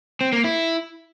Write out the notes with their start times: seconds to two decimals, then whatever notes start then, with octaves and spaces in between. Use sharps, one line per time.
0.21 C4
0.33 A#3
0.44 E4